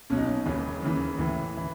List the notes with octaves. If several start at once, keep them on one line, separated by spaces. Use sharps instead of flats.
B1 B2 C#4
D#4
C#4
E1 D#2 C#3 E3 C#4
D#2 C#3 E3
A1 A2 E3
E3